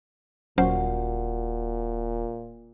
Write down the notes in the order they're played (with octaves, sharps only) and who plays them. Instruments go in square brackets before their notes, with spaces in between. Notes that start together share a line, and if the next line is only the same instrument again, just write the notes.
[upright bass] D#1 [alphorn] A#2 [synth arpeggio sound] F#3 C#4 C5 [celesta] F#4 F#5